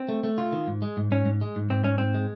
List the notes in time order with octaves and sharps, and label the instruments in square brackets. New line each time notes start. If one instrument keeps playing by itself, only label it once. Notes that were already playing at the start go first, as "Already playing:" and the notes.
Already playing: [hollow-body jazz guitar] C4
[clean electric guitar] A3
A3
F4
D#3
G#2
G#3
G#2
[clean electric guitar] G#2 [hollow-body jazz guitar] C#4
[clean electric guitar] G#2
G#3
G#2
[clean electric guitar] G#2 [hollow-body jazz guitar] C4
[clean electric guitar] G#2 [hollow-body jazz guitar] C#4
[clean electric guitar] G#2 [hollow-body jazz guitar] C4
[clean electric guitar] G#3